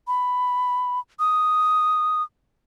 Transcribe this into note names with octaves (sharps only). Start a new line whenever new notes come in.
B5
D#6